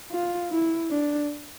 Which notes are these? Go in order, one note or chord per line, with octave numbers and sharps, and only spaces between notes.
F4
E4
D4